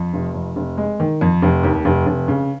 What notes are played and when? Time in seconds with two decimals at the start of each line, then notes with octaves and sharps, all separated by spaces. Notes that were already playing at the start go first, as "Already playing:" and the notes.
Already playing: F2
0.13 F1
0.34 F2
0.56 F1
0.77 G#3
1.00 D#3
1.21 F2
1.42 F1
1.63 D#2
1.85 F1
2.06 F1
2.28 C#3